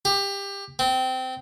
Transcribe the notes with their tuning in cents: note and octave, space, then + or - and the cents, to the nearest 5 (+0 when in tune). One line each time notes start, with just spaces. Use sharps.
G4 +20
C4 -20